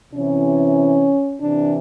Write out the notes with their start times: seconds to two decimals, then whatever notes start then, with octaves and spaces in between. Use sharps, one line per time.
0.14 C3 E3 C#4
1.41 C3 E3 D4